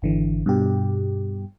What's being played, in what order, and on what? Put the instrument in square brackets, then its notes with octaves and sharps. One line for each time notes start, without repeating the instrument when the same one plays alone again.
[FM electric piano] G#1 D3 E3
G2 B2 G4